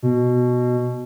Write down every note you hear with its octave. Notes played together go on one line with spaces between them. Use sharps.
B2